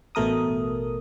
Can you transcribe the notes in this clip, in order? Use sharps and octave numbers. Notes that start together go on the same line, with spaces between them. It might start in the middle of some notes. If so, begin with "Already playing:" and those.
A1 B2 A3 A#4 D#6